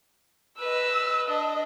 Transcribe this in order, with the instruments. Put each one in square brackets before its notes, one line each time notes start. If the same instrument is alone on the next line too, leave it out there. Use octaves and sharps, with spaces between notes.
[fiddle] B4 D#5 [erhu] E6
[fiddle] D4 [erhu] D#5